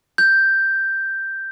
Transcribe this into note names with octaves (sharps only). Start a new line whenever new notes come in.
G6